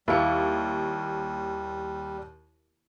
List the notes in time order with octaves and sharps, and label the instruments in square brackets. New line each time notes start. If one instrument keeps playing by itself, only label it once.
[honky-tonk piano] D#2 C#7 [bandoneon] G3 [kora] A#3 E4